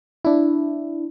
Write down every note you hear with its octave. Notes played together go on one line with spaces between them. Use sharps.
D4 E4